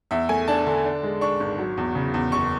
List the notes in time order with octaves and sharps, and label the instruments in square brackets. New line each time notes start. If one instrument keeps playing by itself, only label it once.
[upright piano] E2 E5
A3 G#5
D4 A5
D3
D4
G#3
D4 C#6
G#1
F#3
E2
C#3
E2
F#1 C#6